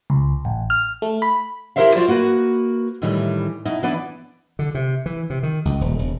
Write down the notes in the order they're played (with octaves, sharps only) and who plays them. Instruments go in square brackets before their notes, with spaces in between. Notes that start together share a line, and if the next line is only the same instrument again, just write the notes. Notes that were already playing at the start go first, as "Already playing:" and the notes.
[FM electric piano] C#2
A1
F6
A3
B5
[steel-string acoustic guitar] E4 G4 A#4 C5 E5 F5
F4 F#4 C5 D5
A#3 F#4 B4
A2 D#3 E3 G3
B2 D#4 E4
E3 B3 D4 B4 D5
[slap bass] D3
C3
E3
C3
D#3
C#2
D#1
E1